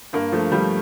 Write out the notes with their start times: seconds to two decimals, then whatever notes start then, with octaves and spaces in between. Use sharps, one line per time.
0.13 G2 A#3
0.32 F3 A3
0.52 F3 G3